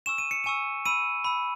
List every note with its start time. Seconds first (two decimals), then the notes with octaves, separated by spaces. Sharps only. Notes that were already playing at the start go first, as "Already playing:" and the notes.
0.06 G#5 C#6 E6 E7
0.18 D#7
0.31 C#7
0.44 G#5 C#6 E6 D#7
0.86 B5 E6 D#7
1.24 B5 E6